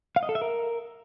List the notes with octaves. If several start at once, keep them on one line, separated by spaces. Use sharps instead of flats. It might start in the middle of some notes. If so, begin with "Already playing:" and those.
F5
D#5
A4
E5
A#4